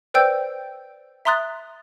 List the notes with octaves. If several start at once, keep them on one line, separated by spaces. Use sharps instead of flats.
B4 C5 D5 G5 E6 G6
E5 A#5 C6 D#6 F#6 A6